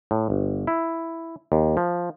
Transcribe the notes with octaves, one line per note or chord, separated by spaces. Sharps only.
A2
G1
E4
D#2
F3